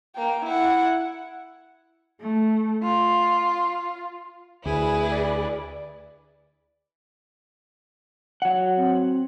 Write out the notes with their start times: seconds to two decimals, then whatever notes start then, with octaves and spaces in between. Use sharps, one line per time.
0.16 A#3 G5
0.46 E4 F#5
2.20 A3
2.84 F4
4.66 D2 E4 G#4 B4
5.12 D5
8.42 F#3 F#5
8.77 C4